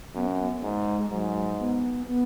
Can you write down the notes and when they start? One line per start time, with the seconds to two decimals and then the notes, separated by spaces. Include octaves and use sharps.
0.14 F#2 B3
0.26 C#4
0.38 B3
0.63 G#2 G#3
1.11 G#2 F#3
1.59 B3
2.07 B3